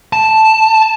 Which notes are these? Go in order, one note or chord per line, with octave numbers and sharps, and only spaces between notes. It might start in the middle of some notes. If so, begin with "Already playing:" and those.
A5